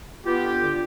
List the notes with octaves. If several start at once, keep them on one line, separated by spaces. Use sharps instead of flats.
B3 F4 G4
D3
D3